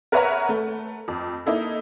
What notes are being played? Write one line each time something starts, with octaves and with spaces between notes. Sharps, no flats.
A#4 B4 C#5 E5 F#5 A#5
A3
F2
A#3 D#4 E4 A4